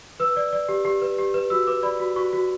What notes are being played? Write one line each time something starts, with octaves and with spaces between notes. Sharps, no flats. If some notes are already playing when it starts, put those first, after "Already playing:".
B4 E6
D5
D5
G4
G4
B4
G4
B4
F#4 E6
B4 D6
D5 B5
F#4
F#4 C#6
F#4